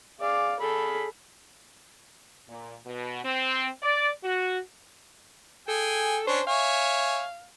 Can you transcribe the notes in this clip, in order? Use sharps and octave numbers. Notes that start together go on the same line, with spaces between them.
G#4 D5 F5
G#4 A4 B5
A#2
B2
C4
D5
F#4
G#4 A4 G5 G#5
C#4 D4 C5 C#5
C#5 E5 F5 G#5